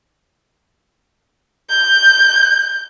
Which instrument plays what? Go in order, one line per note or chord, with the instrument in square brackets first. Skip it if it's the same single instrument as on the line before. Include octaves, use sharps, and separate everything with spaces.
[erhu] G6